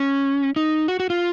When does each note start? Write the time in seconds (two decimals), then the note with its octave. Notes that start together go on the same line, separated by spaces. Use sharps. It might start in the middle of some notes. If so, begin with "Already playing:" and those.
Already playing: C#4
0.56 D#4
0.88 F#4
1.00 F#4
1.10 F4